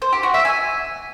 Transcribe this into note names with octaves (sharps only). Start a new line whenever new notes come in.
C5
G4
F#4
E5
G#5